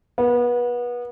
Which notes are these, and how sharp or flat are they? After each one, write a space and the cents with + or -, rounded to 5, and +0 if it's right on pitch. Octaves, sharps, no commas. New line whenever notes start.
B3 -25